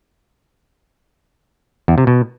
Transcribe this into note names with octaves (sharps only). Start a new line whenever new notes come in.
E2
C3
B2